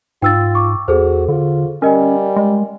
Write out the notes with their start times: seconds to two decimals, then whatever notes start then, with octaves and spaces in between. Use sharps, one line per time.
0.22 G#2 F4 G5 E6 A6
0.55 C#6 D6
0.88 E2 F#4 G#4 A4 C5
1.28 D3 F4
1.82 G3 C#4 A#4 D#5 G#5
2.36 G#3